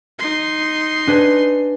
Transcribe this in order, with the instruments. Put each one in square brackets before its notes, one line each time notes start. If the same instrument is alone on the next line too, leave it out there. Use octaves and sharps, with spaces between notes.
[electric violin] D#4 C6
[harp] D4 B4 G#5